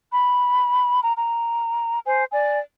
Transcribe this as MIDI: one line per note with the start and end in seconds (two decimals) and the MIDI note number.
0.12 1.00 83
1.03 1.12 82
1.18 1.99 82
2.07 2.23 72
2.07 2.23 80
2.32 2.59 74
2.32 2.59 80